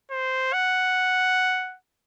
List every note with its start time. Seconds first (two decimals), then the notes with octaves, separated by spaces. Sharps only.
0.11 C5
0.53 F#5